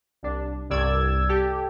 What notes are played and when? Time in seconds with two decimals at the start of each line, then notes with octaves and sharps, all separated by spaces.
0.23 C2 D4
0.70 C2 G2 D5 E6 G#6
1.29 G4 A4